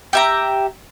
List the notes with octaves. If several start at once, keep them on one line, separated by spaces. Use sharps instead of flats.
G4 E5 A#5